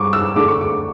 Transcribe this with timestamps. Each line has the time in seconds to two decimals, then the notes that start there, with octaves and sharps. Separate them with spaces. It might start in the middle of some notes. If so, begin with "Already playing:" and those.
Already playing: G3 C#6 D6
0.13 E6
0.36 D3 A3 D4 D6
0.48 C#6
0.61 D6